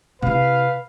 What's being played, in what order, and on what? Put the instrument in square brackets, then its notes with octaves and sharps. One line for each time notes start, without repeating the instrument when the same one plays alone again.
[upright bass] C3 E4 [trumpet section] B4 F5